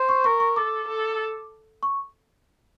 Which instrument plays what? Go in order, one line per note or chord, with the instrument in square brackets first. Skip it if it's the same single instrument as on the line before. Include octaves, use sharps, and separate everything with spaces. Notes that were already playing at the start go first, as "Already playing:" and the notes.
Already playing: [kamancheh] C5
[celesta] C#6
[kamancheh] A#4 [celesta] C#6
[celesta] C#6
[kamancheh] A4 [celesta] D6
[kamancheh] A4
[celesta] C#6